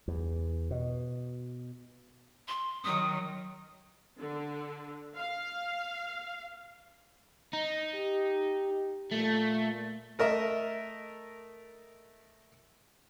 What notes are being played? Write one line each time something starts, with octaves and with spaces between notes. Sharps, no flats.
E2
B2
C6
D#3 F#3 D#6
D3
F5
D#4
G4
A#2 A3
A3 A#4 D#5 E5